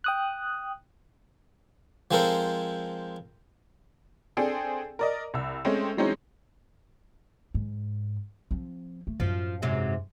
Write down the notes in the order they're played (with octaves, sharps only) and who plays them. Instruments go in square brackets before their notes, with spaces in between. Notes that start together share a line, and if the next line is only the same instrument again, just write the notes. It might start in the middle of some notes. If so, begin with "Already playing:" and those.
[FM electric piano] G5 D#6 F#6
[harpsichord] F3 G#3 C4 A4 A#4 C5
[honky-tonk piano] C4 D4 G#4 A4 G5
A#4 D5 D#5
C2 E6
G#3 A3 C4 C#4
E3 F#3 G#3 C4 C#4 D#4
[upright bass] G#2
F3 C4
A3
[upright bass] F#2 A2 [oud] F3
[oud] G#2 C3 F#3